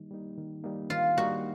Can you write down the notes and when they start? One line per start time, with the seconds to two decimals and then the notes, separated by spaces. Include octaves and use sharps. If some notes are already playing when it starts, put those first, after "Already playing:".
Already playing: D#3 G3 A#3 D#4
0.11 G3 A#3 D#4
0.37 D#3
0.64 G3 A#3 D#4
0.90 D#3 F4
1.17 G3 A#3 D#4 F#4